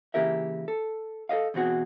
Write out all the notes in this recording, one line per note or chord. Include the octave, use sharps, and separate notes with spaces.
C#3 E3 A#3 G4 A#4 E5
A4
A4 C5 D#5 F5
E2 B2 C4 F#4 G#4